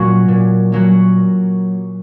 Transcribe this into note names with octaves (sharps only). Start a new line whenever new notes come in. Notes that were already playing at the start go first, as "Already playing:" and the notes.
Already playing: A#2 F#3 A#3 C#4 F#4
A#2
F#3 A#3 C#4 F#4